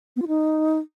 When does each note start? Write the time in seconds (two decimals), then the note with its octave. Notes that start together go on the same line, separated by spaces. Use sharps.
0.16 B3
0.22 F4
0.28 D#4